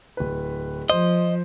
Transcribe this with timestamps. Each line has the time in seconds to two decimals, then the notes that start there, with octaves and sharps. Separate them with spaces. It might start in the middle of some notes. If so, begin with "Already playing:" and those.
0.17 D1 B4
0.90 F3 C5 D#5